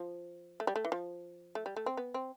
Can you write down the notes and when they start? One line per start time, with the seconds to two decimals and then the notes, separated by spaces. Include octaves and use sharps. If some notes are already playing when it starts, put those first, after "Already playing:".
Already playing: F3
0.60 A3
0.67 G3
0.76 A3
0.85 E3
0.92 F3
1.55 A3
1.66 G3
1.76 A3
1.86 C4
1.97 B3
2.14 C4